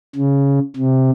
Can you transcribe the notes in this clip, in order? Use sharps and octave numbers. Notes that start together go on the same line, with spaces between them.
C#3
C3